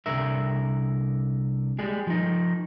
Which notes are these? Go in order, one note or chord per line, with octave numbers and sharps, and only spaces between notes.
C2 D3 A#4 E5
G3 G#3 G#4
F3 D#4